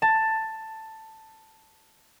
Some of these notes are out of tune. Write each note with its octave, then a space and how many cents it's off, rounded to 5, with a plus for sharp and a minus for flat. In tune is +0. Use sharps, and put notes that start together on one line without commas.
A5 +10